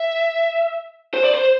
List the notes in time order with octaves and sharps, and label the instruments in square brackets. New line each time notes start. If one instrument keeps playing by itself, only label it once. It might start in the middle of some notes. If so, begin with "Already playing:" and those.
Already playing: [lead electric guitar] E5
C5
D5
C5